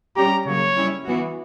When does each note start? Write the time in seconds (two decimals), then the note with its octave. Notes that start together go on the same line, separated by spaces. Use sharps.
0.17 G3 C#4 G4 A#5
0.46 C#3 F#3 A#3 C#5
0.77 G3 C#4 E4
1.06 E3 B3 F#4